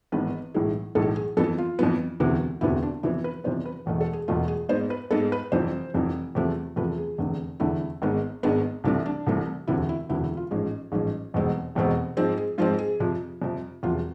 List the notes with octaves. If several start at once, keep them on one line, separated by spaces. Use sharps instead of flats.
G#1 G#2 E3 B3 B4
B1 A2 E3 G#3
B1 A2 E3 G#3 A4
G#4
F2 E3 B3 A4
F4
F2 E3 B3
E1 D2 C3 E3 B3
E1 D2 C3 E3 B3 E4
D4
F2 C3 E3 B3 E4
B4
F2 C3 E3 B3 C5
B4
E1 E2 B2 A3
A4
G#4
E1 E2 B2 A3 F4
G#4
G#2 G#3 B3 C5
B4
G#2 G#3 B3 A4
B4
F1 F2 E3 C5
F1 F2 E3
E2 C3 F3 A3
E2 C3 F3 A3 B4
G#4
F1 E2 D3 A3
F1 E2 D3 A3 E4
G#1 G#2 G#3 B3
G#1 G#2 G#3 B3 D4
C2 C3 E3 A3 D4
D4
C2 C3 E3 A3
E1 D2 C3 E3 E4
E4
E1 D2 C3 E3 E4
E4
F4
A1 G#2 F3 G#3
A1 G#2 F3 G#3
F1 E2 B2 G#3 C4
F1 E2 B2 G#3 C4
G#2 F3 G#3 C4
G#4
G#2 F3 G#3 C4 F4
G#4
F2 C3 F3
F2 C3 F3
E1 E2 C3 F3 F4